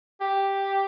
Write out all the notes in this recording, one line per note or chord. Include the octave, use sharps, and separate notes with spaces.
G4